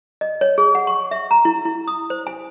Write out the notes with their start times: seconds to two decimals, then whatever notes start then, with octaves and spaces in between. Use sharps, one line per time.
0.21 D#5
0.41 C#5
0.58 G#4
0.75 F#5
0.87 C#6
1.11 E5
1.31 A#5
1.45 E4
1.65 E4
1.88 D#6
2.10 C5
2.27 G#5